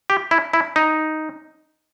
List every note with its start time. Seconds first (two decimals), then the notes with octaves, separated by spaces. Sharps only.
0.10 G4
0.31 E4
0.53 E4
0.76 D#4